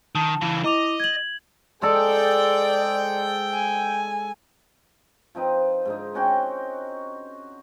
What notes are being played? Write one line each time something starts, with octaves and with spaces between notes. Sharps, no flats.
D#3 A5
C#3 E3
E4 D#5 D6 F7
G#6 F#7
G#3 G#4 A4 C5 D5 G5
G#5
F3 C4 D#4 B4
G#2 D3 D#4
C4 C#4 F#4 G5